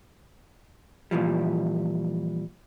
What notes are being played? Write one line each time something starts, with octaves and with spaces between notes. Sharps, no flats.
A#2 E3 F3 G3